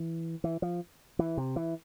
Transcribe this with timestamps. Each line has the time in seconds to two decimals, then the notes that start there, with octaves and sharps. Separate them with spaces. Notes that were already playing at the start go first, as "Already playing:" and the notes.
Already playing: E3
0.44 E3
0.62 F3
1.19 E3
1.37 C3
1.56 E3